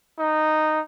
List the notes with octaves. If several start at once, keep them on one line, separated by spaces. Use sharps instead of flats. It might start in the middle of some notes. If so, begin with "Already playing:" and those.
D#4